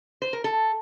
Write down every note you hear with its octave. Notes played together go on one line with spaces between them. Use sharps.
C5
A#4
A4